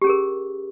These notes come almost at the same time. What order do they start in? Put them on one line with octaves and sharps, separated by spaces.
G4 C#4 G#4 A#4